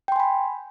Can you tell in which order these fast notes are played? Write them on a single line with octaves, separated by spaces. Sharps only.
G5 C6 G#5 B5